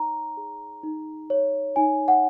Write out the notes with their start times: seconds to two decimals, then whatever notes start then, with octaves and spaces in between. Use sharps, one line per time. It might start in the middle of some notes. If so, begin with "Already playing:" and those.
Already playing: D#4 C#5 A#5
0.37 G#4
0.83 D#4
1.30 C#5
1.76 D#4 G#5
2.08 F#5